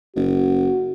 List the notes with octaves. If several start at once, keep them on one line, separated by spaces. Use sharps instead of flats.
F#1 F#4